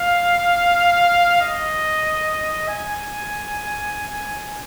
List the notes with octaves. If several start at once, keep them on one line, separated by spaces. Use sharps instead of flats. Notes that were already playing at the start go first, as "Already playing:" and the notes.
Already playing: F5
D#5
G#5